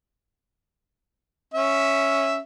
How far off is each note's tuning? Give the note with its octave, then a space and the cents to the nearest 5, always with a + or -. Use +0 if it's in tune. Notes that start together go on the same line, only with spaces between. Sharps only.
C#4 +0 E5 +0